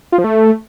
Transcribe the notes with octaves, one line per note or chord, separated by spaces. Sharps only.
F4
F3
A3